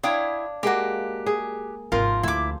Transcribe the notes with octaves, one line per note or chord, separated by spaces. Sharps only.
D4 E4 C#5 F5 G5 D#6
G#3 A#3 F#4 G4
G#4
G#1 C3 F3 F4 A#4
D2 E4 D6